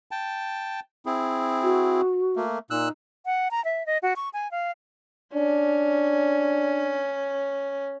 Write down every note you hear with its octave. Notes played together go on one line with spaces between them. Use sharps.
G5 A5
C4 E4 G#4
F#4
A3 A#3
A#2 D#4 E6 F#6
F#5
A#5
E5
D#5
F#4
C#6
G#5
F5
C#4 D4